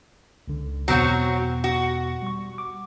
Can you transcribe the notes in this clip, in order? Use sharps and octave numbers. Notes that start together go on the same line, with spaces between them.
C#2 D3
E2 B2 F#3 C4 F#4 F#5
F#4
G3 C#6
D6